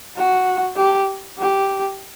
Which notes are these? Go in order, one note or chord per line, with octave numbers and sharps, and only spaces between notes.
F#4
G4
G4